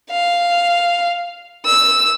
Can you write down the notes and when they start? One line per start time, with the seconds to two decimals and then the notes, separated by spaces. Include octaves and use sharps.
0.11 F5
1.66 E6